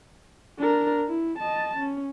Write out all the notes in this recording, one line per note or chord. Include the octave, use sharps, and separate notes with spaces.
D4 A#4
E4
D#5 A5
C#4